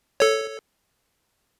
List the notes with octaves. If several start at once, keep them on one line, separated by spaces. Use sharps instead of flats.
A4 C#5